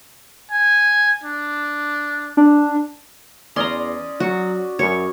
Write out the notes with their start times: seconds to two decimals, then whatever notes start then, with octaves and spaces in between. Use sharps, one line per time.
0.51 G#5
1.24 D4
2.37 D4
3.56 E2 C#4 D5 D#5 A#5 C6
4.20 F#3 F#4
4.79 F#2 C#5